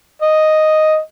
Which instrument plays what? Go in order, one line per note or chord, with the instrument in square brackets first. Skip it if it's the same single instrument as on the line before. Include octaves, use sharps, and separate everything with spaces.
[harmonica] D#5